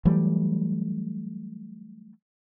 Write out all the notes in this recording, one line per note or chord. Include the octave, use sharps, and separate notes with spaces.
E3 F#3 G3 A3